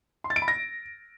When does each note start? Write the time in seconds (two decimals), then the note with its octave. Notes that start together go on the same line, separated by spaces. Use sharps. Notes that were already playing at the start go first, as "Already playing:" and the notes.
0.24 C6
0.30 A6
0.36 D7
0.42 B5
0.48 A#6